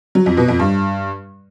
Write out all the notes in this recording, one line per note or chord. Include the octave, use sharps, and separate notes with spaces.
F#3
F2
B2
F2
G2